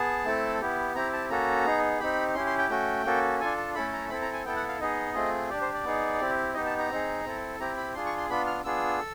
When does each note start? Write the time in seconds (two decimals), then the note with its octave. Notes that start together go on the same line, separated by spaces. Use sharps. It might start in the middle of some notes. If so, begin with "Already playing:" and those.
Already playing: B3 G#4 A5
0.25 A3 C4 E4 A4
0.61 B3 E4 G4
0.95 C4 E4 G4 A#5
1.13 A5
1.30 A#3 C#4 F#4 A4 A#5
1.65 B3 D#4 G#4
2.00 C4 D#4 G4 B5
2.35 C#4 E4 G4 C6
2.46 C6
2.59 G5
2.70 A3 C#4 F#4 G5
3.05 A#3 C#4 F#4 A4
3.40 D4 F4 A4 G#5
3.57 A5
3.75 A3 C#4 E4 A4 B5
3.93 A#5
4.09 C4 E4 A4 B5
4.22 A#5
4.33 G#5
4.44 B3 E4 A4 G5
4.56 F#5
4.69 F5
4.81 B3 D#4 G#4 D#5
5.14 A3 C4 F4 G#4
5.49 D4 G4 D5
5.61 C5
5.73 D5
5.84 B3 D#4 G#4
6.20 C4 E4 G4
6.54 B3 D#4 G4 D#5
6.66 A5
6.79 A#5
6.90 C4 D#4 G#4
7.25 C4 E4 A4
7.59 C4 E4 G4 A#5
7.77 B5
7.94 D4 F4 G#4 C6
8.06 C#6
8.17 C6
8.29 B3 D4 F4 B5
8.47 F6
8.64 B3 D4 F4 G#4 E6
8.99 A4